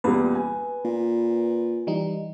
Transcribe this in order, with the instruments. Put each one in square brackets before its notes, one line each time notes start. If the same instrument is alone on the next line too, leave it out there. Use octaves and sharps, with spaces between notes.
[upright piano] E2 A#2 G3 [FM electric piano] B4
[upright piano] G#5
[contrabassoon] A#2
[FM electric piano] E3 G3 D#4